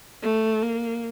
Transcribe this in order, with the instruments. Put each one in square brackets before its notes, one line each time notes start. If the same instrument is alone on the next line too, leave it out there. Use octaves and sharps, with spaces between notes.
[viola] A3
A#3